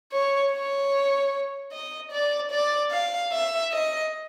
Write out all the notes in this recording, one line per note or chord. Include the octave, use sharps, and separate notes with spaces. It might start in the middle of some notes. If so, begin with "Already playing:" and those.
C#5
C#5
D#5
D5
D5
F5
E5
D#5